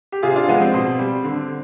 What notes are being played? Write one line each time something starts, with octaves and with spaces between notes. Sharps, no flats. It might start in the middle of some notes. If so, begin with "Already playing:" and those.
G4
C3 F4 G#4
D4 F4
F3 G#3 B3
C4
B2
G3
D3